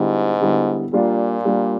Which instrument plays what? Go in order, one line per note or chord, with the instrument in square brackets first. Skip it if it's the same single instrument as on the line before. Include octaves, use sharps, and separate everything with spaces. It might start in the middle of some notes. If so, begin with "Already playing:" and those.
Already playing: [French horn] G#2 [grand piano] D3 G3 B3 E4
[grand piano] D3 G3 B3 E4
[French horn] A#2 [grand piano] G3 A#3 D4 F4
[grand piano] G3 A#3 D4 F4